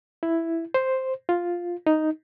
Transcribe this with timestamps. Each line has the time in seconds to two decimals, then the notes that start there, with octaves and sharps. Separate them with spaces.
0.23 E4
0.74 C5
1.29 F4
1.87 D#4